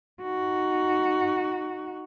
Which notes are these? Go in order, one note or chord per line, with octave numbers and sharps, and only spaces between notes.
D#4 F#4